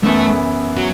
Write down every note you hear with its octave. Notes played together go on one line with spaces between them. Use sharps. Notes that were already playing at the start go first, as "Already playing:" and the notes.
F#2 E3 A3 B3 E4
F#3